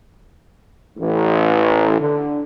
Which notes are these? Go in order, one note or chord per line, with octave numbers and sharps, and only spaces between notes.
A1
D3